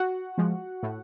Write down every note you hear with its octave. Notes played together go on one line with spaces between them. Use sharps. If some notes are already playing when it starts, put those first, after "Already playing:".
Already playing: F#4 F#5
F3 G#3
A2